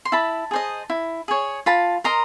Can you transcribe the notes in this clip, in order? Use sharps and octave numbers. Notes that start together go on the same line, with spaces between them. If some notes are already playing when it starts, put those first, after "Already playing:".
C6
E4 A5 B5
G#4 C5 D#5
E4
G#4 C#5
F4 A5 B5
A#4 D#5 A#5 C6